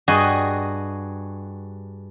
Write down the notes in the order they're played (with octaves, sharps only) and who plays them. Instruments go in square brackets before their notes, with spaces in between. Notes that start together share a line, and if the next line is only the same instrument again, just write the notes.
[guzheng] G2 F#4 G#4 D#5